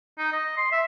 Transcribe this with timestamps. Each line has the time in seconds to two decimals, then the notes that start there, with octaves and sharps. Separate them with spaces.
0.18 D#4
0.32 D#5
0.57 C6
0.72 E5